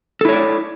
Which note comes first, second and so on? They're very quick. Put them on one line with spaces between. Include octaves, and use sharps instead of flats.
A4 E4 C#5 D5